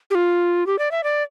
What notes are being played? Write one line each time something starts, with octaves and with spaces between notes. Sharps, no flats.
G4
F4
G4
D5
E5
D5